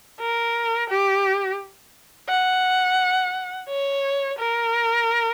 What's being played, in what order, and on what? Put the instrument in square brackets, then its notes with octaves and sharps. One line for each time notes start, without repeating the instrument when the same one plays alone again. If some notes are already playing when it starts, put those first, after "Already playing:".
[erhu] A#4
G4
F#5
C#5
A#4